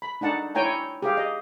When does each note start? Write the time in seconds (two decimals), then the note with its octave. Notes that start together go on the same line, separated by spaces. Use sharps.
0.02 B5
0.21 D4 D#4 F#5 A5
0.55 E4 C#5 G5 G#5 A#5
1.02 G4 G#4 F5
1.17 D#5